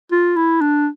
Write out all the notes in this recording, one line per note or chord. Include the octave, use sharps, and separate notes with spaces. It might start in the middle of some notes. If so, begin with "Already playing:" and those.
F4
E4
D4